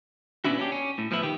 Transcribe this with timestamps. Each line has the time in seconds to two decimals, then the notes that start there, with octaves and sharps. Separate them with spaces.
0.44 A#2 B3 C#4 D4 E4 F#4
0.58 C#4 D4 G4
0.72 C#4
0.98 A2
1.11 A2 F3 B3 E4
1.23 D#3 G4